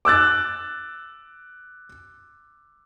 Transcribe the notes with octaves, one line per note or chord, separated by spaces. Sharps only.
D6 E6 F#6 A6